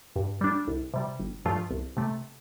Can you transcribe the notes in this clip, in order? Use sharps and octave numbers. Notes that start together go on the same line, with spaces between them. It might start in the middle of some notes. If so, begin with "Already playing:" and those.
G2
G3 D4
C2
C3 G3
G1
G2 F3 A3 F4
C2
C3 A3